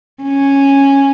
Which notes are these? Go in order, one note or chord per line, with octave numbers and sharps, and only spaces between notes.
C#4